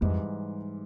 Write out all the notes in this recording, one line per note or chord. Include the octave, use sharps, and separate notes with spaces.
F2 G#2 E3 G3